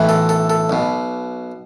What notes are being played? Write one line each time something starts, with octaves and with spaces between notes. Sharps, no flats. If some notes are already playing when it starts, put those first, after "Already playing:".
Already playing: B1 A2 E3
A4
A4
A4
B1 B2